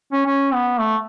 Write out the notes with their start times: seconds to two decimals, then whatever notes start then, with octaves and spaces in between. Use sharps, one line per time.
0.13 C#4
0.26 C#4
0.54 B3
0.80 A3